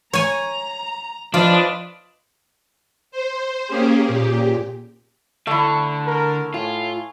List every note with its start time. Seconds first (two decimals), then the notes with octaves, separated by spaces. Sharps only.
0.13 C#5 G#5 A#5
1.34 F3 D4 F4 B4 D#5
3.11 C5
3.67 A#3 C#4 G4 G#4
4.08 A#2 G4
5.47 D3 A3 E4
6.07 A#4
6.54 A2 F4 G#5